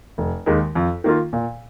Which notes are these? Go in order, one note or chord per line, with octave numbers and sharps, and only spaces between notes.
F1
D#2 D#3 G#3
F2
D#3 A#3 F4
A#2